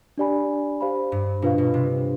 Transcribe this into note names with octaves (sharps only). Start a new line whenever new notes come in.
D4 G4 D5 G#5 B5
G4 C5 F5 B5
G2
B2 D4 F4 B4 F5
B2
C3